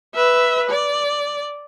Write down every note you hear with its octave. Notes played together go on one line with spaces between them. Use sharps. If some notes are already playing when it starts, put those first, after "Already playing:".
B4 E5
D5